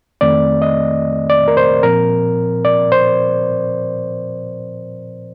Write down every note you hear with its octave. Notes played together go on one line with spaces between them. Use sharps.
F2 D#3 A3 C4 D5
D#5
D5
A#4
C5
A#2 F3 C4 A#4
D5
C5